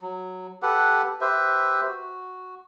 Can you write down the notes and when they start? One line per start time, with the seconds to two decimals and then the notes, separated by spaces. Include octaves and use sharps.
0.01 F#3
0.62 G4 A4 B4 F#5
1.21 G4 B4 C5 E5
1.88 F#4